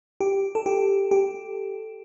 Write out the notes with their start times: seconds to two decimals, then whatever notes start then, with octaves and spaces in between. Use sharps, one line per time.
0.20 G4
0.55 A4
0.66 G4
1.11 G4